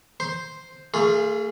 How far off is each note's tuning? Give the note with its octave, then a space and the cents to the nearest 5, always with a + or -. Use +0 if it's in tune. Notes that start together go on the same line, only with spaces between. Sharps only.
C5 +0 C6 +0
A3 +40 F4 +0 G#4 +0